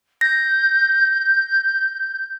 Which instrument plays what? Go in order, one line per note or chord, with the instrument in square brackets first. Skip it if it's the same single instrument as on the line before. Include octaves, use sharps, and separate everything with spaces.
[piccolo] G6 [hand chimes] A#6